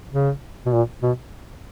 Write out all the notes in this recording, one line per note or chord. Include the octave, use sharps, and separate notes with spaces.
C#3
B2
A#2
B2